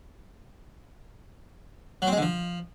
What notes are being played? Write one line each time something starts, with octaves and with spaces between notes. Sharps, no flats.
F#3
C4
G#3
D3
F3